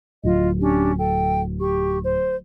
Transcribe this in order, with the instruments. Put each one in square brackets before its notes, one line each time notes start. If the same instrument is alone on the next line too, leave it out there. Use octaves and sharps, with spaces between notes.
[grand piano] D1 [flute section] F4 D#5
[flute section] C#4 D4 G4
A4 G5
G4 C#6
C5